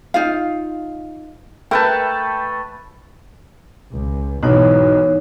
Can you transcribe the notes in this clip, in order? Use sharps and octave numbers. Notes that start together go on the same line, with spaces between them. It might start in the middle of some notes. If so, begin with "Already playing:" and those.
D#4 F4 F5
A3 A#4 B4 G5 A5 G6
C#2
B1 G#2 E3 D#4 C#5